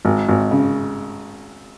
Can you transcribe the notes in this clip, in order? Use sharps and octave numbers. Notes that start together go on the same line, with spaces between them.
G#1
G#1
C#3